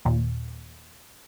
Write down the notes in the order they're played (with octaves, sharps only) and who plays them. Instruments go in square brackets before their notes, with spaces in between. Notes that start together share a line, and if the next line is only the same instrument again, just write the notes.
[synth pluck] D#2 A#2